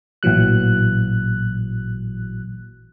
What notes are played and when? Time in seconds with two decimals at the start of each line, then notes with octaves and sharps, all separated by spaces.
0.23 A1 A#2 E3 F#3 F#6